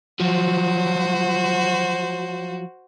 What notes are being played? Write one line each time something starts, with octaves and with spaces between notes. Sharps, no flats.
F3 F#3 F#4 C5